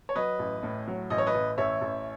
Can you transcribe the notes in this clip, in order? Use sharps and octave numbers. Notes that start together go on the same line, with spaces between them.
C#5
F#3 B4 D#5
A1
A2
F#3
A1 D#5
C#5
B4 D#5
A1
A1 C#5 E5
A1